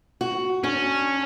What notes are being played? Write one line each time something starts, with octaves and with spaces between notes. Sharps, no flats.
F#4
C#4 D4